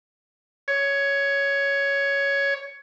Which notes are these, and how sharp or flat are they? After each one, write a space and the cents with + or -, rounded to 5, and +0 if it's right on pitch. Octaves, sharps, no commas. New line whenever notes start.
C#5 +10